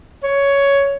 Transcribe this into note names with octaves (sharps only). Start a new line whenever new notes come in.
C#5